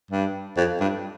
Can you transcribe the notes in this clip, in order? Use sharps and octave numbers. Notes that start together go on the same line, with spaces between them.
G2
F2
G2